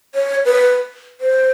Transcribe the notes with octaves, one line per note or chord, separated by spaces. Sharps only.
C#5
B4
C5